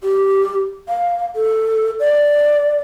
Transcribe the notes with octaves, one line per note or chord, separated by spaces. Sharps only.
G4
F5
A4
D5